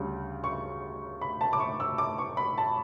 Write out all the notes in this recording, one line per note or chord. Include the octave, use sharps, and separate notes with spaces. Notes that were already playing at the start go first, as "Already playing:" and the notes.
Already playing: D2 C#3 G3 C#4
C#6
B5
A5
D6
C#6
E6
D6
C#6
B5
A5